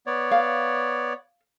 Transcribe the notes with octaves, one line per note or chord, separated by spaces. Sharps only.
B3 C#5 D5
F5